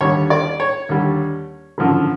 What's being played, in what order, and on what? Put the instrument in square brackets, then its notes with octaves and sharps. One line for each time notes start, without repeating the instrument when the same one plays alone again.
[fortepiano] D#2 D3 G3 C#5
D5
C#5
D#2 D3 G3
G#1 F#2 D3 F3